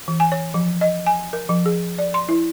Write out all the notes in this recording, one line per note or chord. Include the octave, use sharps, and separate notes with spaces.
E3
G#5
C#5
F3
D#5
G#5
A#4
F3
G#4
D5
C6
E4